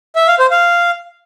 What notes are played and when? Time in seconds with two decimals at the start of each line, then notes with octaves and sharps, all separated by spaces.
0.16 E5
0.27 F5
0.39 C5
0.51 F5